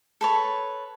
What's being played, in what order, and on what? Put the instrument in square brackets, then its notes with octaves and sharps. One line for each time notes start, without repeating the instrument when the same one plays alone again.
[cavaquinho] A4 B4 C#5